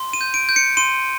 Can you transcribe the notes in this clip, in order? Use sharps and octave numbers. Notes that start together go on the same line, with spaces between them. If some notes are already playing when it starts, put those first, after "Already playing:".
Already playing: C6
D#7
G6
D7
G6
C#7
C6 D#7